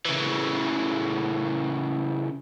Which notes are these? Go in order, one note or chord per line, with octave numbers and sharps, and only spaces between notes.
C#3 E3